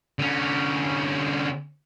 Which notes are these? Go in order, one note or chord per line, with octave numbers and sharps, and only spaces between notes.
D3 C#4